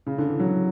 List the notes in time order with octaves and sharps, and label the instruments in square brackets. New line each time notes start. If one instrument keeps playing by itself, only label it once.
[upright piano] C#3
D3
E3
F#3